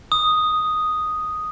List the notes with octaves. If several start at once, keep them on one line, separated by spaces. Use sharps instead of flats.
D#6